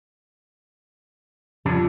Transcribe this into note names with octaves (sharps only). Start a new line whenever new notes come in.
F2 C#3 F3 G3 D4